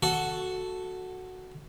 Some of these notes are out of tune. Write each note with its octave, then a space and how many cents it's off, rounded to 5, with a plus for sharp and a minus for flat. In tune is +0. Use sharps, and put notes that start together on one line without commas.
F#4 +0 A4 +0